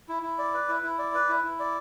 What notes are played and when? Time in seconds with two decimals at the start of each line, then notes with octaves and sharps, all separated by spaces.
0.09 E4
0.23 E4
0.38 D5
0.54 B4
0.69 E4
0.83 E4
0.99 D5
1.14 B4
1.29 E4
1.44 E4
1.59 D5